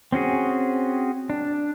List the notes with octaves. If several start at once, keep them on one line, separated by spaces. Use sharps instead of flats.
C4 C#4 F#4 G#4
D4